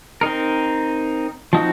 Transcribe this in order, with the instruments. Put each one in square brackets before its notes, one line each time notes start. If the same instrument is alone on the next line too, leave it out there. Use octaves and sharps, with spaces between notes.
[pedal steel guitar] C4 D#4 A#4
F3 C4 D#4 F#4